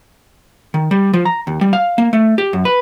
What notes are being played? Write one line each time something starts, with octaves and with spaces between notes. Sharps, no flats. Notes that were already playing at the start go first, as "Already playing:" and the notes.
D#3
G3
F3
A#5
D#2
G3
F5
A#3
A3
G4
F#2
B4